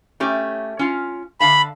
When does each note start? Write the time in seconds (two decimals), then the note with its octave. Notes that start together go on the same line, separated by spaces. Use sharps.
0.20 A3 C#4 G4
0.79 C#4 F4
1.40 D3 F5 A5 B5